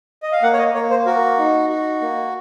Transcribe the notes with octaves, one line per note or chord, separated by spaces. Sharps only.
D#5
F5
A#3 F#5
C#5
D#5
A#3 C#5
C5
F#4 A#4
D#4
F#4
A#3